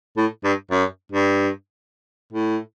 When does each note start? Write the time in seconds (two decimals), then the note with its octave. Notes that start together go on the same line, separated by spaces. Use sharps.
0.17 A2
0.44 G2
0.71 F#2
1.12 G2
2.33 A2